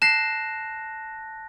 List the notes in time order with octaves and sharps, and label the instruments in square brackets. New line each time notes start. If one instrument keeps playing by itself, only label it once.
[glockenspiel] A5 F#6 A#6 [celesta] C7 E7